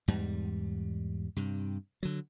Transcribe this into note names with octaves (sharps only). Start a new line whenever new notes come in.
E2 G#2 G3
G2 C3
D3 F#3